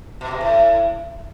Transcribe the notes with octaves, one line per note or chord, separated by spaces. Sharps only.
B2
C3
A2